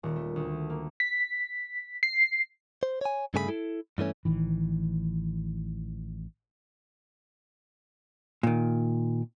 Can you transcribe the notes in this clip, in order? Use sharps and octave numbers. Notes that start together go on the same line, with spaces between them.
D#1
A3
D2
A#3
B6
C7
C5
C#5 G#5
G2 C#3 A3 G#4 A#4 B5
E4 A4
G2 E3 A3 C#4
A1 D#3 E3
A#2 D#3